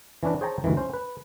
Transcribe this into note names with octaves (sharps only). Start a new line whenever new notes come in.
E3 C#4 D4 B4
G#4 C5 C#5 G5 A5 A#5
D2 G2 D#3 E3
C#4 C5
B4